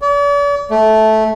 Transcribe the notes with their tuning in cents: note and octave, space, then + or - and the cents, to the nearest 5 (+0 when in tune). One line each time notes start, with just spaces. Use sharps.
D5 -45
A3 -10